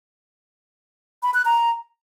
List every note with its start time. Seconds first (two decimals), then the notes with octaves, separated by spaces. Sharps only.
1.23 B5
1.34 F#6
1.45 A#5